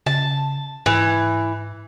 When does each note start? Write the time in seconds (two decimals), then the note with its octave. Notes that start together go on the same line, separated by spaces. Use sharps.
0.06 C#3 A5
0.86 G#2 E3